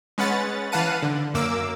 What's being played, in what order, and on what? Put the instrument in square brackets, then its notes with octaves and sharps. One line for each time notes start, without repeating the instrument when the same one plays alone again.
[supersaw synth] G#3 C#4 B4 F#5 A6
E3 B4 F5 F#5 A5 D#7
D3
F#2 A#3 D6 E6